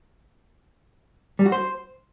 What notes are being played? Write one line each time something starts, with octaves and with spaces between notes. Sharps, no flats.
G3
F#4
C5